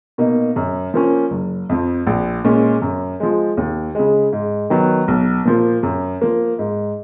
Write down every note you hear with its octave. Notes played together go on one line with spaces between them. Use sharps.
B2 A#3 D#4
F#2
F3 A#3 C#4
F#1
F2 F3
A#1
A#2 G#3 C#4
F#2
F3 G#3
D#2
C#3 G#3
G#2
D#3 F#3 B3
B1
A#2 F3 A#3
F#2
F3 A#3
G#2